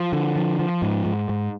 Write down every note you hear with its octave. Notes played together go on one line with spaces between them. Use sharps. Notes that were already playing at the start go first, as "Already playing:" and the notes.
Already playing: F3
D3
F3
F3
G#2
G#2
G#2